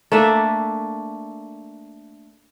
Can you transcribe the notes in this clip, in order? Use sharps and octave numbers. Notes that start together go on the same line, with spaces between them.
A3 A#3 D4 E5